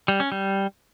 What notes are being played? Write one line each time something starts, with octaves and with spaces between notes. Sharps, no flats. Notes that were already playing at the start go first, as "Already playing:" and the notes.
G3
C#4
G3